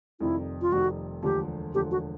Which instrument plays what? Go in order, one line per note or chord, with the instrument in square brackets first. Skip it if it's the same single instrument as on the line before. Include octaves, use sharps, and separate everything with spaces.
[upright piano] F1 F2 C3 D#3 G3 [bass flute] E4
[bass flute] F4
[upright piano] F1 F2 C3 D#3 G3 [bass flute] F#4
[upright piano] E1 D2 D3 F3 [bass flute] G4
[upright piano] E1 D2 D3 F3 [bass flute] G4
[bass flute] F#4